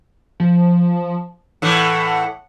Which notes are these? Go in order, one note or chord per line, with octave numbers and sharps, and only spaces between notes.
F3
A2 E3 F#5